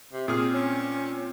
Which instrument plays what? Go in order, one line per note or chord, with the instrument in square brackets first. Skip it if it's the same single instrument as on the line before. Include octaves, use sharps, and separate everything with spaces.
[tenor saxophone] C3
[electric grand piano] A#2 C4 F6 [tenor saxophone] G#4
[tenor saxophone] C#4